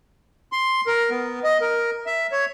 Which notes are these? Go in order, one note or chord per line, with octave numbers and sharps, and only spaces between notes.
C6
A#4
B3
D#5
A#4
E5
C#5